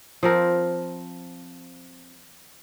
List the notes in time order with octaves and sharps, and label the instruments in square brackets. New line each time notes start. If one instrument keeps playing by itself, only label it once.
[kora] F3 C4 A#4